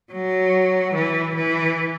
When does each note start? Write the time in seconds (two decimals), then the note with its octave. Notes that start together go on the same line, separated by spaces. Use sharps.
0.12 F#3
0.95 E3
1.36 E3